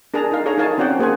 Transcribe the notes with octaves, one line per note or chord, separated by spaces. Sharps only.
D4 G#4 A#4 A5 A#5
D#4 A#4 F5
G#4 A4 C#5 A#5
D#4 G#4 A#4 F5 G#5 A5
C4 C#4 F#4 D5 F#5 G5
A#3 G#4 C5 F#5 G#5